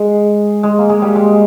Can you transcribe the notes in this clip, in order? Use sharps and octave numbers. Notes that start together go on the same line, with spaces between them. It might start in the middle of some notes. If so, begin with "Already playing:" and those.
Already playing: G#3
G#3
A#3
G#3
G3
G#3